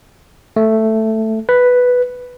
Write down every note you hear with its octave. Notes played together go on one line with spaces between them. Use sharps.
A3
B4